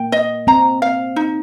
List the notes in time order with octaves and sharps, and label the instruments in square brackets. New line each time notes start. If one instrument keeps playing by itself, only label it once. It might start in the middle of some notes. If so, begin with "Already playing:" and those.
Already playing: [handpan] A#3 [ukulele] G5
[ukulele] D#5
[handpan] C4 [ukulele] A#5
[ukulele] F5
D#4